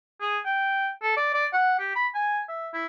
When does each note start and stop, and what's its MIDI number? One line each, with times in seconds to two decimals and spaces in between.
0.21 0.39 68
0.46 0.90 79
1.03 1.16 69
1.17 1.29 74
1.34 1.46 74
1.53 1.78 78
1.79 1.91 67
1.96 2.08 83
2.15 2.41 80
2.49 2.69 76
2.74 2.86 64